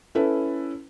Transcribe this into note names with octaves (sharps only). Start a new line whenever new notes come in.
C#4 E4 A4 B4